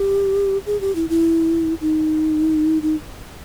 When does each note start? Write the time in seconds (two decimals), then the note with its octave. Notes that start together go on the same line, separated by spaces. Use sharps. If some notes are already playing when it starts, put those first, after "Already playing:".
Already playing: G4
0.66 G#4
0.81 G4
0.95 E4
1.09 E4
1.81 D#4
2.82 D#4